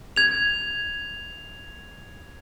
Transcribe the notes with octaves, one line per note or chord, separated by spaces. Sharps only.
G#6 F7